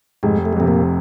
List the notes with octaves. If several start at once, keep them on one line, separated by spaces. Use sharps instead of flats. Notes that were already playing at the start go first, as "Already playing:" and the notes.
F1 G#2 G#3
A3
G#3
F2 A2 C3 A3
A#2 A#3